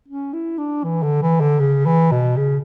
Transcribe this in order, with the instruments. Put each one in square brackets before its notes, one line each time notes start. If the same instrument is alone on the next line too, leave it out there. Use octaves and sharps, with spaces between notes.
[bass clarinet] C#4
E4
D4
E3
D3
E3
D3
C#3
E3
B2
C#3